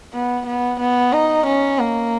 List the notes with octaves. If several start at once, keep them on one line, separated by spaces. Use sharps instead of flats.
B3
B3
B3
D#4
C#4
A#3